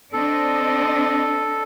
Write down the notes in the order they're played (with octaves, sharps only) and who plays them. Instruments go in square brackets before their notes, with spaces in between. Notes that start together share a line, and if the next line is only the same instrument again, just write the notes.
[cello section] C4 D4 D#5 [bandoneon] A4